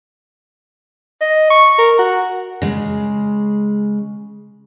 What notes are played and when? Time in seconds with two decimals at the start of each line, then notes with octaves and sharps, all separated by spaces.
1.21 D#5
1.50 C#6
1.78 A#4
1.99 F#4
2.62 C#3 G#3